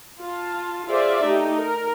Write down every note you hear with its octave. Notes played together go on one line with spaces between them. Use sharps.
F4 A5
F4 G#4 C5 D5 E5
A3 D#4 G4
A#4